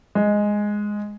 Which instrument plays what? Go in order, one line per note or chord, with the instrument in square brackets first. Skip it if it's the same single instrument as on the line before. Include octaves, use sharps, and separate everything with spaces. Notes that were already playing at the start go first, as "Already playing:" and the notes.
[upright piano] G#3